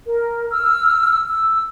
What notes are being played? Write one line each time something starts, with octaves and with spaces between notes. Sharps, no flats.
A#4
E6 F6
E6